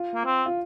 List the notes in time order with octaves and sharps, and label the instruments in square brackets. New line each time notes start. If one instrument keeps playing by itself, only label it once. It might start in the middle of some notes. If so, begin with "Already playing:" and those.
Already playing: [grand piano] F4
[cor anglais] A#3
C4
[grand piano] F4